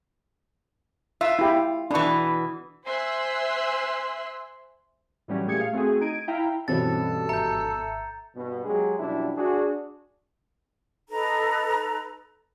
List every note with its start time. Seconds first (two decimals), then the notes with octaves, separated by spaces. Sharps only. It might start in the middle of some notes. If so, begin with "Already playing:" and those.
1.21 F4 E5
1.39 E4 G4
1.91 B2 E3 D4 C#6
2.86 C5 E5 G#5 C6 E6 F#6
5.28 A2 E3 F#3 G3 C#4
5.46 A#2 A3 G4 G#4 G#6 C#7
5.60 F5
5.73 A3 C4 F#4 G#4
6.01 D#4 G#6 D7 D#7
6.28 E4 E5 F5 G5 A#5
6.68 G2 B2 E3 G3 C4 C#4 A4 A6
7.29 G#1 E5 A#5 G6 C#7
8.36 G2 B2
8.65 F#3 G#3 G4 G#4
8.99 F#2 B2 F3 G3 D4 E4
9.37 D4 F#4 G#4
11.09 D#4 A4 B4 A#5